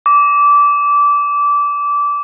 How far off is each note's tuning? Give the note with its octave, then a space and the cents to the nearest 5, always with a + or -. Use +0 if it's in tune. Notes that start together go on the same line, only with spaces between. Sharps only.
D6 -20